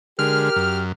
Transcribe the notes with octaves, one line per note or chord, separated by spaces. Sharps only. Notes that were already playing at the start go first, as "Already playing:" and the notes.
D3 G#3 G4 A#4 F6
F#2